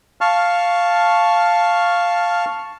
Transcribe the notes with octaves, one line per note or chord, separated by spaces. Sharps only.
F5 A5 C#6 F6